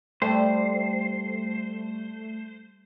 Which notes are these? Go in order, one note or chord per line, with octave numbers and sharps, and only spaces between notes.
G3 A3 C5